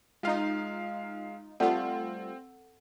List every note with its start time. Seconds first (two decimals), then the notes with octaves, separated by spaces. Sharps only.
0.23 G#3 D#4 F4 F5
1.60 G3 A3 C4 F4 A4 F#5 A5